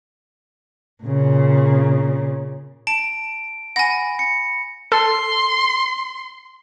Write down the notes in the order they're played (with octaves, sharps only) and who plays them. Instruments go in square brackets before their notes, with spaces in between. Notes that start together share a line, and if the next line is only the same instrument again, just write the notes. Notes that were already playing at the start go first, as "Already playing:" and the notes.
[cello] A#2 C#3
[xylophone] A5 [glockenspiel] D7
[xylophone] F#5 G#5 [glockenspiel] B5 A#6
[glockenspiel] C#7
[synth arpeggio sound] A4 [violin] C6